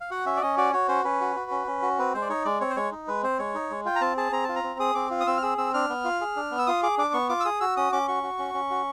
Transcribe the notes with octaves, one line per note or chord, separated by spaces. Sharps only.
F5
F#4 F#5
C#4 E5
D5
C#4 D#5
F#4 D5
F#4 C#5
C#4 C5
C#4 B4
F#4
F#4
C#4
C#4
F#4
C4 B4
G#3 C5
D5
D#4 C#5
G#3 D5
C4 C#5
C5
G#3 C#5
D#4
G#3 B4
C4 C5
G#3 C#5
D#4
G#3
F4 G5
A#5
C4 A5
G#4 A5
C4 A#5
F4 A5
A#5
C4
G#4 D#6
C4 D6
F4
D#6
C4 E6
F6
G#4 E6
C4 E6
D4 F6
B3
F4
G#4
D4
B3
E6
F4 D#6
G#4 D6
D4 D6
B3 C#6
F4 D6
E6
G#4 D#6
F#4 E6
C#4 D#6
C#4 D6
F#4 C#6
F#4
C#4
C#4
F#4